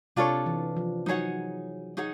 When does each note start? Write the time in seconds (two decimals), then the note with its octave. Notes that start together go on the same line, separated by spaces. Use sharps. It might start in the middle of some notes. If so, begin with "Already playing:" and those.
0.16 C3 D4 F4 A4 C#5
0.46 E3
0.77 F3
1.06 F#3 D#4 G#4 C#5 F#5
1.97 D#4 G#4 C#5 F#5